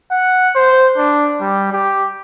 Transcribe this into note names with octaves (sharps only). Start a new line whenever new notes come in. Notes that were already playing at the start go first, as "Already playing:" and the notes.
F#5
C5
D4
G3
G4